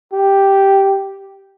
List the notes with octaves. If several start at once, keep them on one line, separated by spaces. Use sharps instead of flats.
G4